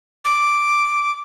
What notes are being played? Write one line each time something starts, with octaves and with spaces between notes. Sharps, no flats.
D6